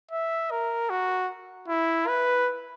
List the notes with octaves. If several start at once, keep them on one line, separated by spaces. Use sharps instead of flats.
E5
A#4
F#4
E4
B4